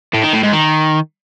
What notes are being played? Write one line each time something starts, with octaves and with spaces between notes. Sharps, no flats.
A2
D#3
A2
G#2
D#3